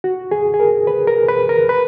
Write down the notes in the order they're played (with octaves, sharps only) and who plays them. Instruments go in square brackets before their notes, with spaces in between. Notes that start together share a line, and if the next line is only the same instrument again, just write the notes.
[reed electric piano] F#4
G#4
G#4
A#4
B4
A#4
B4
A#4
B4